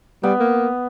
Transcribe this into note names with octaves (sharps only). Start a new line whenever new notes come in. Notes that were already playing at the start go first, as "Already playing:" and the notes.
G3 B3
A#3